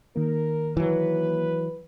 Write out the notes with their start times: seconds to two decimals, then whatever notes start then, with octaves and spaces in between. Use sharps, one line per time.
0.16 D#3 A#3 A#4
0.77 E3 F#3 B4